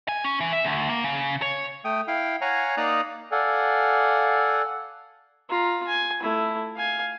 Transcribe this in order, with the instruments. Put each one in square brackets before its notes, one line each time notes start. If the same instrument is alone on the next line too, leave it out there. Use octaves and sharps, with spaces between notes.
[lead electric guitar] G#5
C#4
E3
E5
D2
A#3
C#3
C#5
[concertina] A3 G5 D#6
E4 F5 G5
C#5 F5 F#5 G#5 A#5
A#3 D#4 D5 A#5 D#6 F#6
[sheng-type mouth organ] A4 D5 F5 F#5 G#5
[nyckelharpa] F4 A#5
G#5
A3 E4
F5 G#5